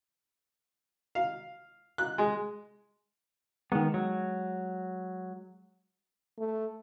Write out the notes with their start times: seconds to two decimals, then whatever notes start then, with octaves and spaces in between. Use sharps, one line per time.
1.15 F5
1.98 F#6
2.18 G#3
3.72 D#3 G#3 B3
3.94 F#3
6.38 A3